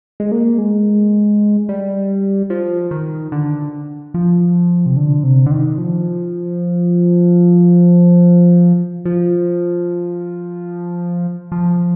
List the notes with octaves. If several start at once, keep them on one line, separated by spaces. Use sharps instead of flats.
G#3
A#3
G#3
G3
F3
D#3
D3
F3
C3
D3
C3
D3
D#3
F3
F3
F3